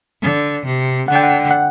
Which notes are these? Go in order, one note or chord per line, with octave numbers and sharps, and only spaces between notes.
D3
C3
D3 F#5
G5
F#5
F#5